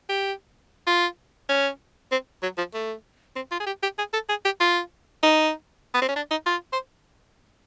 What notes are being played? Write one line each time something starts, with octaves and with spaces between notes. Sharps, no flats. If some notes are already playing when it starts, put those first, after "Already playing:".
G4
F4
C#4
C4
F#3
F3
A3
C4
F4
G#4
G4
G4
G#4
A4
G#4
G4
F4
D#4
B3
C4
C#4
D4
D#4
F4
C5